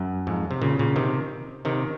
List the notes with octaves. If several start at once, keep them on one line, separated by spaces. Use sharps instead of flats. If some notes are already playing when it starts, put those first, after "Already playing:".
Already playing: F#2
F2 G#2
C3
A#2 C#3
A#2 C#3
C3 D#3
C3 D#3